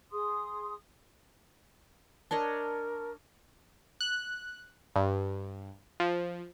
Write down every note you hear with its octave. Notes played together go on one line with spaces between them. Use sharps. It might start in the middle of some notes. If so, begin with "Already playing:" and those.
G#4 C6 D#6
D4 A#4 C#5 D#5 A5
F#6
G2
F3